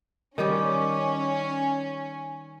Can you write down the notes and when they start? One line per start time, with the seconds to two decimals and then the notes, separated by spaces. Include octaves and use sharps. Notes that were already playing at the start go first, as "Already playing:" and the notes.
0.38 D#3 G3 C#4 G4